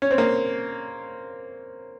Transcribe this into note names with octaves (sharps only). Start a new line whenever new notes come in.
C#4
C4
A#3